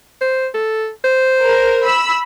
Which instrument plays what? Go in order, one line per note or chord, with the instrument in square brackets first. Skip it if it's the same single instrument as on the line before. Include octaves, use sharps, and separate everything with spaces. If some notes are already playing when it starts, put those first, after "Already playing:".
[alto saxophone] C5
A4
C5
[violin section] A#4
B5 E6